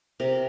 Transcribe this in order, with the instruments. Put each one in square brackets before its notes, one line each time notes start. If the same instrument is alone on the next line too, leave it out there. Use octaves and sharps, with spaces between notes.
[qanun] C3 A#4